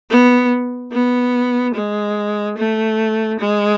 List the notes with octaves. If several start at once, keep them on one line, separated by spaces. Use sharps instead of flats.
B3
B3
G#3
A3
G#3